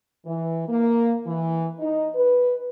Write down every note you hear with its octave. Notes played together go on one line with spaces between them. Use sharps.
E3
A#3
E3
D#4
B4